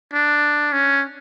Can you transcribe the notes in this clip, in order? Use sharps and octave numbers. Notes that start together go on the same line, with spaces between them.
D4
C#4